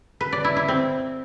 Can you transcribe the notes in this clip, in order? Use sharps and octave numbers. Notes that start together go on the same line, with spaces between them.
B4
D5
E4
E4
C4